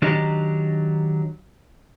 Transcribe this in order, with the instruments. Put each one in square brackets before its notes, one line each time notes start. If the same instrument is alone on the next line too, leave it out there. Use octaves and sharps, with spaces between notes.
[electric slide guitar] D#3 F#3 D4 G4 D#5 A#5